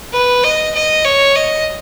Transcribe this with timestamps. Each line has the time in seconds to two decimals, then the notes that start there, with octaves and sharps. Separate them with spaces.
0.13 B4
0.44 D#5
0.75 D#5
1.05 C#5
1.36 D#5